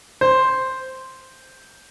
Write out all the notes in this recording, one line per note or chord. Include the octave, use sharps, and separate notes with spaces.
C5